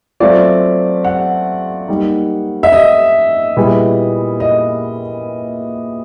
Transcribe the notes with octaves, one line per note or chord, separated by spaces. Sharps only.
F#3 A3 C4 F4 D5
F#5
G3 A#3 D#4
E5
D#5
A#2 G3 B3 E4 G#4
D#5